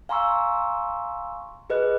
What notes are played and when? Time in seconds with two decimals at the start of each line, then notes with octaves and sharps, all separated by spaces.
0.09 F5 G#5 A#5 C6 C#6 E6
1.70 G#4 B4 D#5 F#6